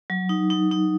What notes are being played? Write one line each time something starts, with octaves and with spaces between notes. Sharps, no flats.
F#3
D#4
D#4
D#4